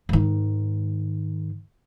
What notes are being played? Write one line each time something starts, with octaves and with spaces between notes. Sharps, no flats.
G#2 D#3